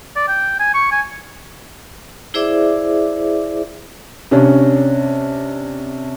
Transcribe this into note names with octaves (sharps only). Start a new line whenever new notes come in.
D5
G5
G#5
C#6
G#5
E4 G#4 C5 D5 E5 D6
C3 C#4 D4